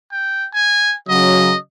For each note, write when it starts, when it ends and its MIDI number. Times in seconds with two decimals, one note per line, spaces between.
0.12 0.47 79
0.54 0.96 80
1.09 1.53 49
1.09 1.53 54
1.09 1.58 75